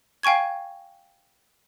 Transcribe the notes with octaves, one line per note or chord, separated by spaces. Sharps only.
F5 G5 G#5 C#6 G#6